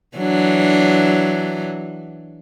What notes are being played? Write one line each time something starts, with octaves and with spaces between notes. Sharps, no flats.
E3 F#3 D4